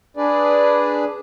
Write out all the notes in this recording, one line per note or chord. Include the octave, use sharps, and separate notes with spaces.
D4 G#4 B4 D5